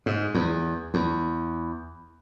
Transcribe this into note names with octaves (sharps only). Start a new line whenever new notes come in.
G#2
E2
E2